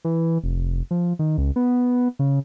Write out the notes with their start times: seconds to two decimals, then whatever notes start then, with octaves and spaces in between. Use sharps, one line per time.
0.05 E3
0.44 F1
0.91 F3
1.19 D#3
1.38 C#2
1.56 B3
2.19 C#3